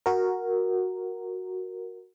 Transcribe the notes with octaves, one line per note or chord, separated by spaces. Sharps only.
F#4 A#4